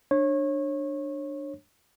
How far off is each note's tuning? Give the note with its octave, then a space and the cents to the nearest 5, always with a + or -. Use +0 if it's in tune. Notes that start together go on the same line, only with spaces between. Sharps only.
D4 +15 C#5 -25